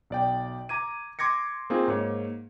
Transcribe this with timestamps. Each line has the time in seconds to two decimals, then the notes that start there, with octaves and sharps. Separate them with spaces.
0.10 B1 D5 G5
0.69 A#5 D6 G#6 D#7
1.19 C6 D6 G#6 A#6 C#7
1.70 A#3 C4 D#4 F4 G#4
1.88 G#2 A#3 C#5